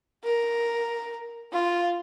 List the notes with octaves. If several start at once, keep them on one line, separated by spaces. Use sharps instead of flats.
A#4
F4